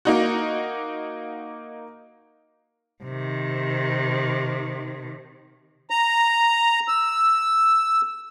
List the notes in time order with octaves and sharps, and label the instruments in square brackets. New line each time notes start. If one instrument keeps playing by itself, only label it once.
[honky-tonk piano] A#3 D#4 F#4
[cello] C3 D#3
[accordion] A#5
E6